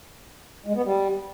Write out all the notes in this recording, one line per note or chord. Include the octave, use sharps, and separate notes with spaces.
G#3
B3
G3